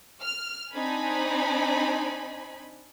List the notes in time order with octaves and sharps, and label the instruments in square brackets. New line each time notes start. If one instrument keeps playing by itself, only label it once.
[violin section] F6
C4 D4 D#4 G#5 B5